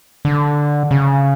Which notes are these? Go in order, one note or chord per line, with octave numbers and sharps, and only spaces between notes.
D3
C#3